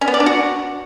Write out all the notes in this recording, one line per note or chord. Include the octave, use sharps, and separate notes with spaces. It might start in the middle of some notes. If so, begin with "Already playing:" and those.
C#4
B3
D5
D4
F#4